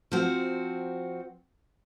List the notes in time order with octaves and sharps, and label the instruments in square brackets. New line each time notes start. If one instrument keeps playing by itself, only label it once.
[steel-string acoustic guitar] F3 C4 F#4 C5